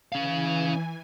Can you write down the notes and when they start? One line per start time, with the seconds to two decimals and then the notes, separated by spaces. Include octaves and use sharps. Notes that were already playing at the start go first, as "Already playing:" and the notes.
0.12 E3 C#4 F5 G#5